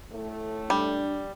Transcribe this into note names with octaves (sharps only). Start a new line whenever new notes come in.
A2 A3
G3 D4